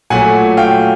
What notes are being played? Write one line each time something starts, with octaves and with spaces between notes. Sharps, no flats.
A#2 F#3 A3 F#5 G#5
F5 G5